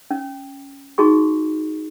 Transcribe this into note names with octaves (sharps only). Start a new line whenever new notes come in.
C#4
D#4 F#4 G#4 C#6